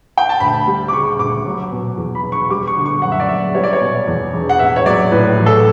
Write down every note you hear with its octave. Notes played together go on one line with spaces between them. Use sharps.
G5
A5
D2 B5
G3
D6
C#3 C#6
D2 D6
F#3
B2
E2
B5
E1
C#6
G3 D6
C#6
D3
C#6
F#2 F#5
E5
D5
F#1 E5
G3 C#5
D5
C#5
B2
E2
E1
F#5
A1 E5
C#5
F#3 D5
A2 B4
A1
A4